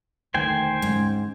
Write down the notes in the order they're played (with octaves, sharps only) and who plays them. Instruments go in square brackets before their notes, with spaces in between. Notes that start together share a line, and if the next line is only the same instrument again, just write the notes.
[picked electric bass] E1 D2 D#3 [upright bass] A3 [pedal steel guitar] C5 G5 G#5
[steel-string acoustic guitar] G#2 [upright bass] G#3 C#4